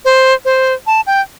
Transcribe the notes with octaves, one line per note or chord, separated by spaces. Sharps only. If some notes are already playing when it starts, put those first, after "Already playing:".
C5
C5
A5
G5